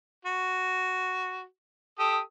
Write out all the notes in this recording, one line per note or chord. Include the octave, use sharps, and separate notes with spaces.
F#4
G4 A4 D#6